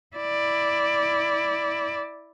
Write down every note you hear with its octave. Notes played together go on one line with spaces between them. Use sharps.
E4 D5